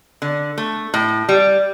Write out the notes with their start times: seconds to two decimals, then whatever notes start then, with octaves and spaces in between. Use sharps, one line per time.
0.22 D3
0.58 A3
0.94 A2
1.29 G3